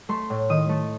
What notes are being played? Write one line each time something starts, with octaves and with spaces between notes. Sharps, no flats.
A3 C6
A2
D#3 D#6
A3